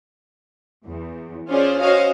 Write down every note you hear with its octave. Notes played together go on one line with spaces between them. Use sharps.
E2
C#4 F4 G#4 C5 D5
C#4 F#4 C5 C#5 D#5 F5